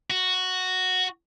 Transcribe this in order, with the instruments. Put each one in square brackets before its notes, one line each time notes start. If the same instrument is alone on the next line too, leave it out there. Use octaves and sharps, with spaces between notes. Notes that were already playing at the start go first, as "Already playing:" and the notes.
[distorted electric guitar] F#4